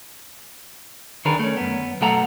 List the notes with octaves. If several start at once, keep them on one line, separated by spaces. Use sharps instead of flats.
D2 D#3 D4 G#4 A#4 B4
A3 C#4
F#2 B3
B1 F#3 A3 A4 F#5 A#5